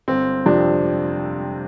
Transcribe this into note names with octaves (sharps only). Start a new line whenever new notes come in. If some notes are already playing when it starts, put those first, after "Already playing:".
G1 C4
F2 C3 F3 D4